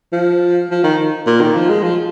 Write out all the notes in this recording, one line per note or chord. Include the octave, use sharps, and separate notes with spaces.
F3
F3
D#3
A#2
D#3
F3
G#3
F3